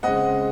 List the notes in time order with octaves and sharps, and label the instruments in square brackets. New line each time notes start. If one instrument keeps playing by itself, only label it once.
[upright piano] C#3 G#3 C4 D#5 F#5